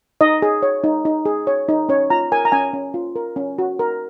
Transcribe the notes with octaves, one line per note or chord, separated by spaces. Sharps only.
D#4 D#5
G#4
C#5
D#4
D#4
G#4
C#5
D#4
C#4 C#5
F4 A#5
A#4 G#5
A#5
C#4 G#5
C#4
F4
A#4
C#4
F#4
A#4